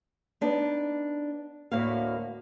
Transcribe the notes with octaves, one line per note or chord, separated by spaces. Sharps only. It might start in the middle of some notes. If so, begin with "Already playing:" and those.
B3 D4 D#4
D2 A2 A#3 E4 F#4 F5